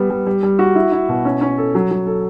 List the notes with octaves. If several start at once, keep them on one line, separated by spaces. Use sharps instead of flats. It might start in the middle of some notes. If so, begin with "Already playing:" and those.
Already playing: G3 B3
G3
G3
G3
F#4
E4
E4
B2
C#4
C#4
A4
F#3
F#3
A4